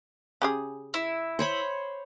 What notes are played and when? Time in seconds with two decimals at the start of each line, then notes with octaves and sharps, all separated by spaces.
0.42 C#3 G4 G#4
0.94 E4
1.39 C5 C#5 B5